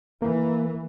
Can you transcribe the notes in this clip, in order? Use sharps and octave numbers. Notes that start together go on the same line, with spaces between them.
E3 A#3